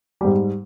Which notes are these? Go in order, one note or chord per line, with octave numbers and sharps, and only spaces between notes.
G#2 G3 G4